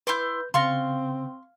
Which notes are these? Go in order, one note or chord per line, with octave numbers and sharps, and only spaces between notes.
E4 B4 C6 D6 G6
C#3 C4 F5 C6 C#6 A6 A#6